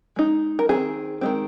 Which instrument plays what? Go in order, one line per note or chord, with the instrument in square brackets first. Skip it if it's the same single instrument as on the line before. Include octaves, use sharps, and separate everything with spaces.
[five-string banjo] G#3 D#4
A#4
D#3 G#3 C4 G#4
D#3 G#3 C4